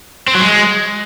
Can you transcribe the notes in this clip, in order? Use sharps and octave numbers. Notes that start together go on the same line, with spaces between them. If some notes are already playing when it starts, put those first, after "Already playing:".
C4
F#3
G#3